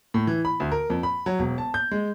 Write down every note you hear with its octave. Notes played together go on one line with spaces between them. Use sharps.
A2
E3
B5
D2
A#4
F2
B5
F#3
E1
A5
G6
G#3